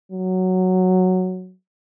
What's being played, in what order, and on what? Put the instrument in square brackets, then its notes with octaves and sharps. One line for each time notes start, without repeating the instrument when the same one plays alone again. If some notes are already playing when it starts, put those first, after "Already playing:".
[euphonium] F#3